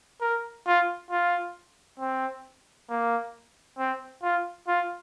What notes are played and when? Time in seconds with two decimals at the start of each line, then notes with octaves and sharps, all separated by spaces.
0.21 A#4
0.67 F4
1.11 F4
2.00 C4
2.90 A#3
3.79 C4
4.23 F4
4.68 F4